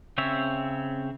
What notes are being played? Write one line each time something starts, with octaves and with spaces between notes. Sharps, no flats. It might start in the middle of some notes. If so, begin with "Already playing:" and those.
C#3 C4 C#5 E5